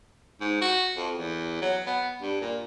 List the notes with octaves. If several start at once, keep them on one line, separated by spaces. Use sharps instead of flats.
G#2
F#4
F2
E2
F#3
B3
G2
A#2